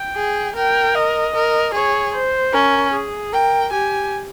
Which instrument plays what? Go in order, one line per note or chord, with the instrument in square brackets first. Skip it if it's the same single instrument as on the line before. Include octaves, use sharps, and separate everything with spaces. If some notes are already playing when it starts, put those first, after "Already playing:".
Already playing: [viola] G5
[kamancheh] G#4
[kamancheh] A#4 [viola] G5
[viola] D#5
[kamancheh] A#4
[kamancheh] G#4 [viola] C#5
[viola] C5
[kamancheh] C#4 [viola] A#4
[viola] G#4
[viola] A#4 [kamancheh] G5
[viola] G4 [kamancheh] G#5